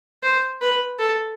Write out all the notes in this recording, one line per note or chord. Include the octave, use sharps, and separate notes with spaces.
C5
B4
A4